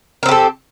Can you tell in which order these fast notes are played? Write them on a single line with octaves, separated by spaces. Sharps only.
A#4 C4 G4 A4